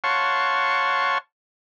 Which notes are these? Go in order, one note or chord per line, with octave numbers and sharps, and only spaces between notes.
C#5 F5 F#5 A5 C6 C#6